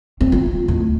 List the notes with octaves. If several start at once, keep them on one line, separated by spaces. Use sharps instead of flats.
C4
F4
D1